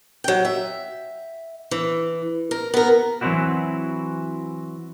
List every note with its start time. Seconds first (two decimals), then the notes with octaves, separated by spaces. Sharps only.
0.24 F#3 G5
0.45 E5
1.71 E3
2.51 A#4
2.74 B3 A#4
3.21 E3 F#3 C4 D#4 E4 F#4